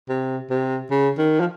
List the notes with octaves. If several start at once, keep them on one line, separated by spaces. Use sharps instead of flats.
C3
C3
C#3
D#3
F3